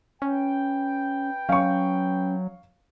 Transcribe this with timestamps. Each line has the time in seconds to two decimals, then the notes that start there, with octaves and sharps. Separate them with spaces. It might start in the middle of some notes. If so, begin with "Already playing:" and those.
0.22 C#4 B4 G5
1.49 F#3 C#4 F5 C#6